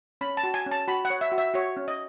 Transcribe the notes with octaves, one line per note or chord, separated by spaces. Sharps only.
C#4 B5
A5
F#4
G#5
C#4
A5
F#4 B5
F#5
C#5
E5
F#4
E5
F#4 C#5
C#4
D#5